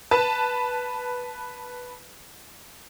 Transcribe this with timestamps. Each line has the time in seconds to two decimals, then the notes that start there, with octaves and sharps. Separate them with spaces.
0.11 B4 A5